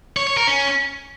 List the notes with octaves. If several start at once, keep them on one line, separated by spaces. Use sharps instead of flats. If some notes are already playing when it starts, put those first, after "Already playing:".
C#5
C#5
A#4
C#4